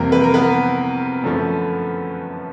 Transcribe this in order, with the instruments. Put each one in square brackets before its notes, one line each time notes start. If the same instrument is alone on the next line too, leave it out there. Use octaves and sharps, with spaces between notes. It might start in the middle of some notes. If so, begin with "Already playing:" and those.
Already playing: [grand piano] F2 C3 E3 G3 A#3 A#4
B4
A#4
B3 B4
F#2 D3 F3 A3 C#4